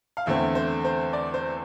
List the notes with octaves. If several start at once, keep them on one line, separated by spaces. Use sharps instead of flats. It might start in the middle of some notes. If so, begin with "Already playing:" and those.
F5
E2 D3 A3 C4 E5
C5
C5
D5
C5